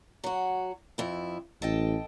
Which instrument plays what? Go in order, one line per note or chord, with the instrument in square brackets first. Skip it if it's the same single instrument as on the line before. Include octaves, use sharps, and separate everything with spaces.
[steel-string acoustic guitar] F#3 F#4
F2 E4
[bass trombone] A1 [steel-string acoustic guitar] A4 D#5 G5